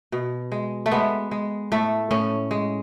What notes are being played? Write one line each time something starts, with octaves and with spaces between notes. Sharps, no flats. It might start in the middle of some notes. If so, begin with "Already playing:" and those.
B2
G#3
A3
G#3 B3
G#3
A2 A3
A2 C#4
G#3